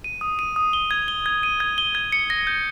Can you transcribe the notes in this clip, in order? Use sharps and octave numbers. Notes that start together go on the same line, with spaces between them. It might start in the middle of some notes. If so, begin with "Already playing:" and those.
D#7
D#6
D#7
D#6
G7
G#6
G7
G#6
D#7
G#6
G7
G#6
C#7
A#6
G6